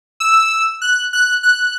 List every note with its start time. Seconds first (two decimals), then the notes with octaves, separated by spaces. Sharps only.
0.20 E6
0.82 F#6
1.13 F#6
1.43 F#6